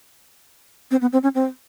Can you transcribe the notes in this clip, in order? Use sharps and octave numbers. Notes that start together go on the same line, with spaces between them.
C4
B3
C4
C#4
C4